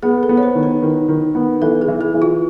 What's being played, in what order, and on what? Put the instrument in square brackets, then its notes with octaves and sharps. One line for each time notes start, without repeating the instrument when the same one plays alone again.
[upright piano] B3 [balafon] G#4
[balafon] A4
[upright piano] B3
[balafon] C#5
C5
[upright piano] D#3
[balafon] B4
[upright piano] D#3
D#3
B3
[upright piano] E3 [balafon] A4
[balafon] G#4
[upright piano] E3
[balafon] G#4
[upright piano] E3
[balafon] F4